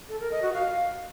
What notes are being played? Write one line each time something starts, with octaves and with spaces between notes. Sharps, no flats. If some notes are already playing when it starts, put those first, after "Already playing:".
A4
A#4
D#5
F#4
F5